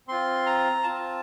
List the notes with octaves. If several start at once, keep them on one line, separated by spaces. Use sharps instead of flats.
C4 F4 C6
A#5
C4 F4 A5